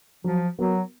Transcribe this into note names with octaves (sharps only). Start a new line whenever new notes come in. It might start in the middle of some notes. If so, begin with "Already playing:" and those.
F3 F#3
F#3 B3 F#4 A#4